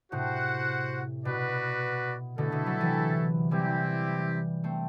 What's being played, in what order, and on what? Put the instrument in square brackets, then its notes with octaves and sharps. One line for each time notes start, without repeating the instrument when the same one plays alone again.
[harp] A2 C3 [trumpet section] F#4 C5 F#5
[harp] B2 [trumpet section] F#4 B4 D5
[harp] B2 D3 [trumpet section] A3 E4 A4
[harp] B2 D3
D3 F#3
C3 E3
[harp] E3 G3 [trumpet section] C4 E4 G4
[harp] A3 C4